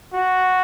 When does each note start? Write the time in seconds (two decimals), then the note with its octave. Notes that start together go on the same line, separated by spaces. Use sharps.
0.14 F#4